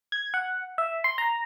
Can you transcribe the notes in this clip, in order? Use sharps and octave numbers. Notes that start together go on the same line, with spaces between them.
G#6
F#5
E5
C6
A#5